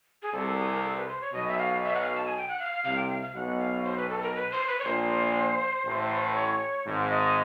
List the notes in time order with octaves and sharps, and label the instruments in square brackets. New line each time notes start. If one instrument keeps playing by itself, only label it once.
[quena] G#4
[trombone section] C2 C3 [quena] A4
[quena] G#4
A#4
A4
B4
C5
C#5
[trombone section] B1 B2 [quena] D#5
[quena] E5
F5
E5
F#5
F5
A5
G#5
G5
F#5
F5
[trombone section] C2 C3 [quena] F5
[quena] G5
F5
F5
[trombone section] B1 B2 [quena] F#5
[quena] F5
C5
B4
A4
A#4
B4
C5
B4
C#5
[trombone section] A#1 A#2 [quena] C5
[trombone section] A1 A2
[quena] C#5
[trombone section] G#1 G#2
[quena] D#5